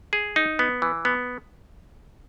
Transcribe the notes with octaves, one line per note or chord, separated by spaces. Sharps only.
G#4
D#4
B3
E3
B3